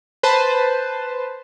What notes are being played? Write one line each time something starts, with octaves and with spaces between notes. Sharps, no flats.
B4 C5 A5